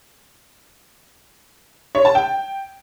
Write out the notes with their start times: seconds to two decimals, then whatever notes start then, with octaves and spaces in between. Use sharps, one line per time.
1.95 C#5
2.05 A5
2.15 G5